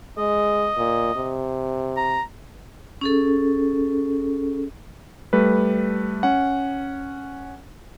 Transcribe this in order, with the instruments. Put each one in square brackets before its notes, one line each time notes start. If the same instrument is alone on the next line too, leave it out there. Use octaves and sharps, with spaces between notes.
[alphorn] G#3 [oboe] D#5
[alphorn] A#2
C3
[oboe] A#5
[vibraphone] C#4 G#4 A4
[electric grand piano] G3 A3 B4
C#4 F#5